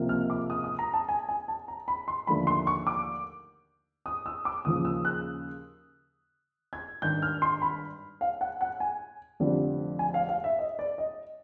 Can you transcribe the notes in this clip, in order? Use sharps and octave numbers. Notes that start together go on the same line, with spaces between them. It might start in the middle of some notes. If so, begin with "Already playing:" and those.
Already playing: C#2 C3 F3 A#3
F6
D6
D#6
D#6
A#5
A5
G#5
G#5
A5
A#5
B5
C6
D#2 D3 F3 A3 B5
C6
C#6
D6
D#6
E6
D6
D#2 C#3 F3 D#6
E6
F#6
G#6
G#1 G2 D#3 G6
F6
C6
B5
F5
F#5
F#5
G#5
F1 F2 D3 G3 C4
G#5
F5
F5
E5
D#5
D5
D#5